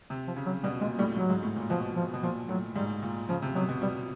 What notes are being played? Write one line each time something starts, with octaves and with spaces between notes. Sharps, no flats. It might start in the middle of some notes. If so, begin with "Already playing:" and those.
C3
F3
C#3
F#3
B2 G3
A#2 G#3
A2 G3
G#2 F#3
G#2
A2
A#2
B2 F3
F3
B2
A#2 F3
A2 F#3
G#2 G3
A#2
C#3 F3
C3
B2 F#3
B2
B2 G3